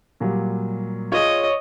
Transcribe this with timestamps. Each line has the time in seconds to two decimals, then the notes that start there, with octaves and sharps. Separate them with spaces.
0.20 A#2 F#3 G3
1.12 F4 G#4 C#5 D#5